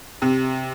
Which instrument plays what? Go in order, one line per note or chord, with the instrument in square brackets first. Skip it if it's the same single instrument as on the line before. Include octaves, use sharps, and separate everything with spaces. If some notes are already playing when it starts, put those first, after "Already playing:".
[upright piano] C3